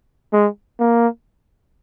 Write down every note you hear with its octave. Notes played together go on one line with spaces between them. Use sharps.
G#3
A#3